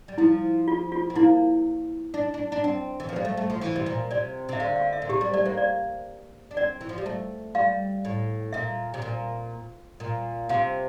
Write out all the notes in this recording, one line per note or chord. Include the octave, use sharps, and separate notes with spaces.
G3
F3 E4
F4
F4
C4
A#3 E4
D4
D4
D4
C4
E3
F3
G3 C5
A3
A3
F3
E3
C3
A#2
C3 D5
C3 E5
D3 F5
F5
E5
A#2
C3 G4
G3
A3 D5
A#3 C5
D5
D4
C4 D5
E3
F3
G3
A3
G3 F5
A2
A#2 E5
C3
A#2
A#2
C3 F5